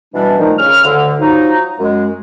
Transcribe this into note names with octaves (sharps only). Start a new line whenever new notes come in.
B2 E3 G3 D4
A#2 D#3 F3 A3 D#4
C#3 F6
D2 A2 D3
F3 F#3 D#4
F#2 G#3